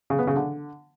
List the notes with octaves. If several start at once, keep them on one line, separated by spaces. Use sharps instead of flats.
C#3
B3
C#3
D3